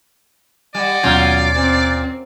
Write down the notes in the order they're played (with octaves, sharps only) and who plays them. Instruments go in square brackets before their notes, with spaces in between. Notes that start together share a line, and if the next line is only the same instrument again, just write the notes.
[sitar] G3 [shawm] D5 [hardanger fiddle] D#5 F#5
[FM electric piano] D#2 B2 G#6 [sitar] F#3 C#4 F4
[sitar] A#2 [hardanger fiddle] C4